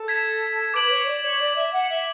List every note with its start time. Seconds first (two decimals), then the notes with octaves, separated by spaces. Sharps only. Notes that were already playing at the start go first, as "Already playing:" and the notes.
Already playing: A4
0.08 G#6 B6 E7
0.73 B4 D6 G#6 D7 F#7
0.90 C#5
1.06 D5
1.23 C#5
1.40 D5 G#6 B6 D7
1.56 E5
1.73 F#5
1.89 E5